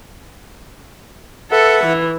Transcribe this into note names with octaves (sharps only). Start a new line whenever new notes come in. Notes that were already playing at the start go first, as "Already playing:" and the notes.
A4 B4 E5 F#5
E3